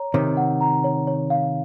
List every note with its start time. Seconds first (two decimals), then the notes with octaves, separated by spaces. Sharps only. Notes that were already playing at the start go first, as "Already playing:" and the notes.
Already playing: C#5 A#5
0.14 C3 D#3 C#5
0.37 F#5
0.61 A#5
0.84 C#5
1.07 C#5
1.30 F5